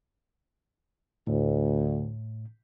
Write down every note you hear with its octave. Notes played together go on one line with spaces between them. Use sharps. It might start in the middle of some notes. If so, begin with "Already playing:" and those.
D2 A2